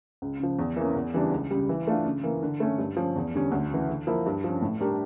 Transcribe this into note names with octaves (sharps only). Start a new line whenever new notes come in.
C#2
C#3 F3
E2
E3 A#3 C#4
E2
C#3 E3 G3 D4
C#2
C#3 G3
E3
A3 D4 F4
C#3
E3 A#3
D3
A3 C#4
G2
F3 C#4
E2
D3 G3 C#4
D2
C#3 E3
D3
F3 A#3 E4
G2
F3 C#4
A2
G3 D4 G4 A#4